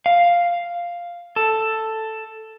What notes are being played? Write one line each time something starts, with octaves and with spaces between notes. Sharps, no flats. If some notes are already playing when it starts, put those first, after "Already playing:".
F5
A4